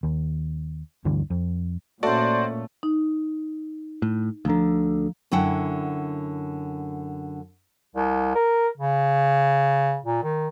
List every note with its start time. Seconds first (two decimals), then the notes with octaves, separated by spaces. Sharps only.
0.03 D#2
1.05 D2 G2 D3 E3
1.30 F2
2.03 A#2 A3 C#4 F#4 C5 D5
2.83 D#4
4.02 A2
4.45 D2 D3 F3 A#5
5.32 F#2 D3 E4 F#5 G5
7.95 C2
8.35 A#4
8.78 C#3
10.04 A#2
10.23 D#3